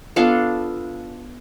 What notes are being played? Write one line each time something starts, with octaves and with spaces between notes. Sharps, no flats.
B3 D4 F4 A4